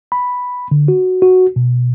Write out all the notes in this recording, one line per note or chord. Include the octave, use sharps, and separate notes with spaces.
B5
D3
F#4
F#4
B2